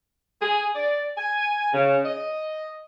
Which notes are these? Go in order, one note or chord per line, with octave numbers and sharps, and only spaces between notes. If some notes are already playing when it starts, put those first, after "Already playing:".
G#4
D5
G#5
C#3
D#5